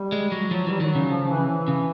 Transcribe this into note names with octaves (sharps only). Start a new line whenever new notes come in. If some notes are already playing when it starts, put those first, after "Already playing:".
Already playing: G3
G#3
F#3
F3 F#3
E3 G3
D#3 F#3
C#3
F3
E3
E3
C#3